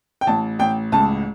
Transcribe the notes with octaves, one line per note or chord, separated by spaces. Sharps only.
G5
A1 A5
A1 G5
C#2 A5